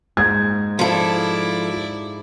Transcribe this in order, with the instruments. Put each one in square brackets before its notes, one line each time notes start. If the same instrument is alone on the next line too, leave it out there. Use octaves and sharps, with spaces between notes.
[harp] G#2 [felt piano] G#6
[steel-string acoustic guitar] F3 A4 [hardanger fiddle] E4 D5